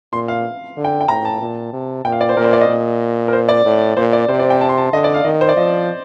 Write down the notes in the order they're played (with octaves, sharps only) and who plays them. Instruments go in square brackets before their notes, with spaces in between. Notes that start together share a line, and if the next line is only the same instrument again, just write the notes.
[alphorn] A#2 [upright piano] C6
[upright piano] F5
[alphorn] D3
[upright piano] G5
G5
[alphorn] A2 [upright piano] A#5
[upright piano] A5
[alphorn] A#2
C3
[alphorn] A#2 [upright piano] G5
[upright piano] F5
D5
C5
[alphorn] A#2 [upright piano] A#4
[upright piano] C5
D5
D#5
[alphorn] A#2
[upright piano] A#4
C5
D5
[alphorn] A2
[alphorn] A#2 [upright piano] C5
[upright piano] D5
[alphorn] C3 [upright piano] C5
[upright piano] D5
G5
A5
C6
A5
[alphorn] D3 [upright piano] D#5
[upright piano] D5
F5
[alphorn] D#3 [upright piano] D#5
[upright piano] C5
D5
[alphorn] F3 [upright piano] D#5